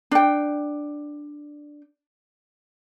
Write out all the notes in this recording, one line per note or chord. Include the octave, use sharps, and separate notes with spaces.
D4 G5